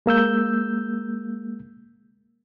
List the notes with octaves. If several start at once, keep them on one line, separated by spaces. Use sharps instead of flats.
G#3 A#3 E6 G6